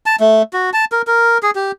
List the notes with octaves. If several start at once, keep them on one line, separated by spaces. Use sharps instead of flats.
A5
A3
F#4
A5
A#4
A#4
G#4
G4